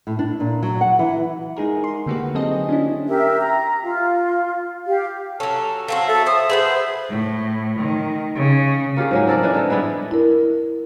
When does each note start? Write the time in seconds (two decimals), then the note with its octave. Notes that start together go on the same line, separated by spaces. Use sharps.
0.07 A2
0.19 D4
0.40 A#2
0.63 F#3
0.81 F#5
0.99 E3
1.57 G#3 D#4 G#4 A#4
1.84 C6
2.06 D3 A3 A#3 F#4 G4 B4
2.35 F#3 C4 G#4 A4 C5 D#5
2.69 C#4 D4 E4
3.08 G4 A#4 E5
3.40 A#5
3.84 F4 F5
4.87 G4 F5
5.40 F#3 C#4 A4
5.88 F#3 C4 F#4 A4 F5
6.07 A4 E5
6.27 C5 D#6
6.49 G#4 B4 C5 F#5
7.09 A2
7.80 D#3
8.36 C#3
8.97 A#3 F4 G4 G#4
9.11 G#2 F#3 G#3
9.27 C4 A4 A#4 D5
9.43 E3 G#3 D4
9.55 D3 A4
9.70 G3 G#3 B3 E4
10.11 E4 A#4